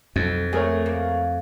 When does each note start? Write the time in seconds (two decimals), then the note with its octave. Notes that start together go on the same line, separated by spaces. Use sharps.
0.16 B1 F2
0.53 A3 B3 G#4 A#4 C#5
0.86 A#3